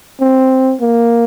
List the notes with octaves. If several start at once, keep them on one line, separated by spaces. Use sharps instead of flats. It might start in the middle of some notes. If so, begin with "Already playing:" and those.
C4
A#3